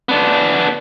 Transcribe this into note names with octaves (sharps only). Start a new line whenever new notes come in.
B3 D4